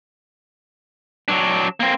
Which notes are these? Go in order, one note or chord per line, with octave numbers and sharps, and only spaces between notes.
F#3 D4
A#3 C4